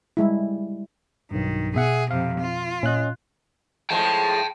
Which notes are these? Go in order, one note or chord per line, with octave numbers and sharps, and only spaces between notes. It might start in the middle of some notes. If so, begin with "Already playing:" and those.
G3 G#3 E4
B1 G2 D#3
B2 G#4 E5 F#5
F2 C3 F5
F4
A#2 C#4 D#5 F#6
A2 F3 G#3 G5 A5